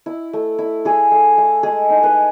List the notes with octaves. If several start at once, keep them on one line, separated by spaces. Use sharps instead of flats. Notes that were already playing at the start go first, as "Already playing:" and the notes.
E4
A3
E4
E4 G#4
A3
A3
G#3 G#4
D#4
B4